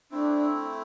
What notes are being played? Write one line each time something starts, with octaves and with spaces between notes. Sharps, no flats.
A3 C4 D4 E4